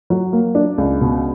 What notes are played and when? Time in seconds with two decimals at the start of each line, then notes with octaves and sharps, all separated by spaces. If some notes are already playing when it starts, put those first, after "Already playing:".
0.10 F#3
0.33 A#3
0.55 D4
0.78 C#2
1.01 B2